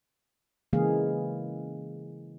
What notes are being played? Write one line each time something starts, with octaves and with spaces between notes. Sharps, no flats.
C#3 E3 G#3 A#3 G#4 F5